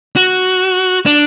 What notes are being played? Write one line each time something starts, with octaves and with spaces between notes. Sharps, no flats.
F#4
D4